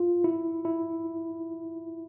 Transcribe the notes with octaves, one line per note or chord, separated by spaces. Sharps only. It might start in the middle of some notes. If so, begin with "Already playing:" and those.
Already playing: F4
E4
E4